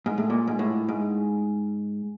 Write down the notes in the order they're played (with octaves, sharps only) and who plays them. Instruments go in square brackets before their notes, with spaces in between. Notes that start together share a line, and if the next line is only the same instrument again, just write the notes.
[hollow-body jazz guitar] G#2
A2
A#2
G#2
A2
G#2